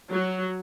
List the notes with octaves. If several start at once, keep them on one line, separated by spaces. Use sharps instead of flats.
F#3